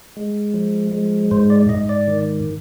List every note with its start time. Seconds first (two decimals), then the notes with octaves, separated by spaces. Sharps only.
0.17 G#3
0.54 F3
0.92 G#3
1.31 G#2 C5
1.50 D5
1.69 G#2 D#5
1.89 D5
2.08 D#3